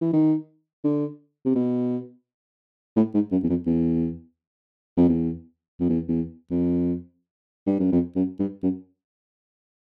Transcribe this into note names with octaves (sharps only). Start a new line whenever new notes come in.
E3
D#3
D3
C3
B2
A2
G#2
F#2
E2
F2
E2
F2
E2
F2
E2
E2
F2
G2
F#2
F2
F#2
G2
F#2